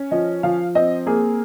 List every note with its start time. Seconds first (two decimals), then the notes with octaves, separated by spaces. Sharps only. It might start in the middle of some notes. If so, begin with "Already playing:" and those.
Already playing: C#4
0.11 F3 D#5
0.43 F3 F5
0.75 C4 D#5
1.06 A#3 G#4